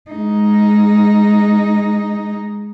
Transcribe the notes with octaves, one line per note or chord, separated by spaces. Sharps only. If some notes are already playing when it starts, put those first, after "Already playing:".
G#3 D#4